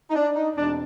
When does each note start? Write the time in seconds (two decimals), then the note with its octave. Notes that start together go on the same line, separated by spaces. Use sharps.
0.11 D#4
0.15 D4
0.35 D#4
0.56 E2 B2 G#3 C4 D4